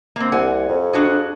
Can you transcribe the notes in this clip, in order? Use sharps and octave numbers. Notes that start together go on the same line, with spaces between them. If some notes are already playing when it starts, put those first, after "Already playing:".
A#3 C4
C2 F#5 G#5
F2
D4 F#4 G#4